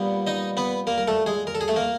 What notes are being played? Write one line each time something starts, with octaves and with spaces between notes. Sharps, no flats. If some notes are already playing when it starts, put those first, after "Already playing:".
Already playing: A#2 G3 B3
D#4 D#5
B3 B4
A#3 A#4
A#4
A3 A4
G#3 G#4
A#4
A4
G#4
A3 A4
A#3 A#4